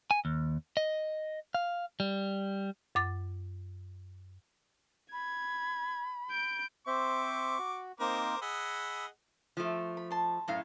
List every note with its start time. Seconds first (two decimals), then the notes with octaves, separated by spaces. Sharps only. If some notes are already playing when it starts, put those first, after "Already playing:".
0.11 G#5
0.25 D#2
0.77 D#5
1.55 F5
2.00 G3
2.95 F#2 D6 A6
5.12 B5 G#6
6.30 G6 D7
6.87 C4 C5 E5 C#6 D6
7.59 F#4
8.00 A#3 C4 D#4 A#4 C5 D6
8.42 G#4 D#5 F#5 B5 E6
9.57 F3 A3
9.97 B5
10.11 A5 C6
10.48 F#2 A2 F5